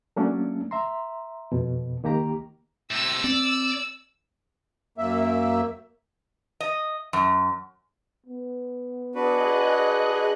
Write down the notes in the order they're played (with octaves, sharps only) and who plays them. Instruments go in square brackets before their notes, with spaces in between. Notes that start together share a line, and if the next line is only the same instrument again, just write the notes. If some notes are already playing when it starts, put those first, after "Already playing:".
[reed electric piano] F#3 A3 A#3 C#4 D4
E5 A#5 C6
F2 B2
C#2 D#3 A#3 G4 A#5
[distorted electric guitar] A2 C3 [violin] E6
[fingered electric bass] C4 [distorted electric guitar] D5
[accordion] F#2 A#3 E5
[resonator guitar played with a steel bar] D#5
F#2
[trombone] B3
[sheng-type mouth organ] D4 F#4 B4 [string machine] G#4 D#5 F#6